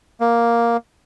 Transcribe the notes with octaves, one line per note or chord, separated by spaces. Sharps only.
A#3